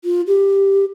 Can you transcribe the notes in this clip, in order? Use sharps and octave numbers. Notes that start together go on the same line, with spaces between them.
F4
G4